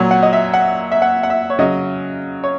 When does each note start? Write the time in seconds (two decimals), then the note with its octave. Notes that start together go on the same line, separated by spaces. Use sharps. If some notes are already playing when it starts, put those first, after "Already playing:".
Already playing: A#2 F#3
0.11 F#5
0.23 D#5
0.33 E5
0.54 F#5
0.91 E5
1.02 F#5
1.23 F#5
1.30 E5
1.50 C#5
1.59 C#3 F#3 D#5
2.44 C#5